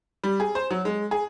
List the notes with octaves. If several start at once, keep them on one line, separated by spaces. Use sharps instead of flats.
G3
G#4
C5
F#3
G#3
G#4